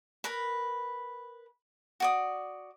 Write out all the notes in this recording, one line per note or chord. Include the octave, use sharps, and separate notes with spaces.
A#4 B4 B5
F#4 D5 D#6